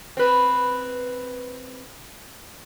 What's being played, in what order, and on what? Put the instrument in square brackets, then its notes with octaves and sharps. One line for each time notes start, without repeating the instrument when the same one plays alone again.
[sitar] C4 B4